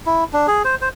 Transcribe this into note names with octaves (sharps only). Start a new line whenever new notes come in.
E4
D4
G#4
C5
C5